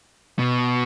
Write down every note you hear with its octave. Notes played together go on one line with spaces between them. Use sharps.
B2